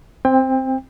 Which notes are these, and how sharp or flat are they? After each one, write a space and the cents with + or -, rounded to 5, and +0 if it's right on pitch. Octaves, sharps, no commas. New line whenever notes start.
C4 +0 G5 +30